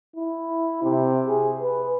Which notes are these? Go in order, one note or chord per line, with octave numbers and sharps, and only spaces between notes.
E4
C3
G#4
B4